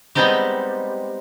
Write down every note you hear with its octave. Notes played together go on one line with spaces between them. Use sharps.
G3 G#3 B3 C4 D#4 G4